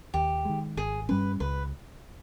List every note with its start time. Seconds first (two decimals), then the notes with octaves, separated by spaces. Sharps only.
0.14 D#2 G4
0.45 D#3 G#3
0.77 G#1 G#4
1.09 G2 G3 C#4 B4
1.40 C#2 B4